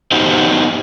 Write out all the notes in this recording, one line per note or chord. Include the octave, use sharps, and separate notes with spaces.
B3 D#4 F#4 G4 C5